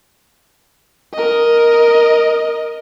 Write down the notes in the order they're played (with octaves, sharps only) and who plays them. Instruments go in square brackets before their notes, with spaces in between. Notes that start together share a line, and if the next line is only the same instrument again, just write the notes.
[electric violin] A#4 D#5